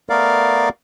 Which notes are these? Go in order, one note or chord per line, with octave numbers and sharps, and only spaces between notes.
A3 B3 A#4 D5 F5